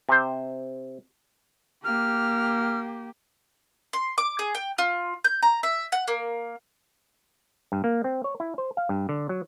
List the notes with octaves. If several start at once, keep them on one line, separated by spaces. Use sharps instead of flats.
C3 C5
A#3 G4 F6
C6
D6
G#4
G5
F4
G6
A#5
E5
F#5
A#3
G2
A#3
C4
C#5
E4
C5
F5
G2
D3
F#3